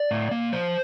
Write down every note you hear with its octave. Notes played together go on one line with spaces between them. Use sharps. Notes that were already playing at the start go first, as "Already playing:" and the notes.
Already playing: D5
A2
A#3
F3 C5